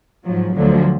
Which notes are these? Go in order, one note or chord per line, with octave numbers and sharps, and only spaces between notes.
G#2 F3 F#3
D2 D3 F3 F#3